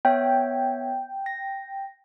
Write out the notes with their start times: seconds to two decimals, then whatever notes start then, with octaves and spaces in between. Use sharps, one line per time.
0.05 B3 C#5 E5 G5
1.26 A#6